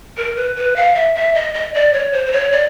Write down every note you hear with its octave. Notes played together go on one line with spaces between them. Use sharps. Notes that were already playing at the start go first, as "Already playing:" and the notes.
A#4
B4
B4
F5
E5
E5
D#5
D#5
D5
C#5
C5
C5
C#5
D5